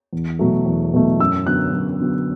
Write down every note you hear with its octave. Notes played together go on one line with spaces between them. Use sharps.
E2
B2 F#3 A3
E2
B2 F#3 A3
F#2 E6
D3 F#3 B3 F#6
F#2
D3 F#3 B3